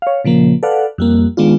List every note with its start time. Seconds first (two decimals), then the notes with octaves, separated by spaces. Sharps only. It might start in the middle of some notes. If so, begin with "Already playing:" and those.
0.02 C#5 F5
0.25 A#2 C#3 F3 A#3
0.63 A4 B4 D5 F5 F#5
0.98 F2 G3 A#3
1.37 D#3 G#3 B3 D4 F4